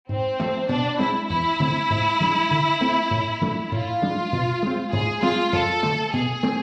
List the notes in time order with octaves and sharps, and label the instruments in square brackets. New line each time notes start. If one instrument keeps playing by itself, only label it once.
[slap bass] G#2 [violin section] C4
[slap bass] F3 A3
[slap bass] B2 [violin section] D4
[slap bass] G#3 C4 [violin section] E4
[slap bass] E2 [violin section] E4
[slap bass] D3 A3 C4
G#2
F3 G#3 D4
D3
A3 C4
A2
F3 A3 D4
[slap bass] A2 [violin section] F4
[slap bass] F3 G#3 D4
B2
G#3 C4
[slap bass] G#2 [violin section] G#4
[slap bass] G#3 C4 [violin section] F4
[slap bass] F2 [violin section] A4
[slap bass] D3 A3
[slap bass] B2 [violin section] G#4
[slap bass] A3 C4